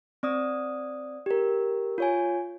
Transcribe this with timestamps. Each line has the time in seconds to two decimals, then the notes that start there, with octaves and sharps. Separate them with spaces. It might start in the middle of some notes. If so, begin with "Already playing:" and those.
0.23 C4 D5 D#6
1.26 G4 A#4
1.98 F4 C#5 G#5